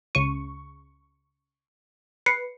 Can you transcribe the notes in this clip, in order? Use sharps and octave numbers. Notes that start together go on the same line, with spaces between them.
C#2 C#3 C#6 D#7
B4 C7 C#7